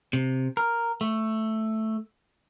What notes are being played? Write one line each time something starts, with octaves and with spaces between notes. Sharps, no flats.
C3
A#4
A3